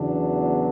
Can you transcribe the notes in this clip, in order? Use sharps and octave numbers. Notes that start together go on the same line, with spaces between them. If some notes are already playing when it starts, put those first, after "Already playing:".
Already playing: E2 C#3 F#3 B3 D4